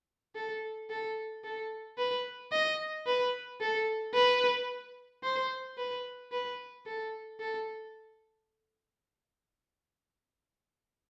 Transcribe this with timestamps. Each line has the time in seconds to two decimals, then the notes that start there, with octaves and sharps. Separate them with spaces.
0.35 A4
0.90 A4
1.44 A4
1.98 B4
2.52 D#5
3.06 B4
3.61 A4
4.14 B4
5.23 C5
5.78 B4
6.32 B4
6.86 A4
7.40 A4